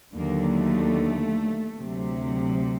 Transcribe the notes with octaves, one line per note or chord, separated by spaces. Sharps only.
D#2 D3 F#3 A#3
A3
D2 C3 F#3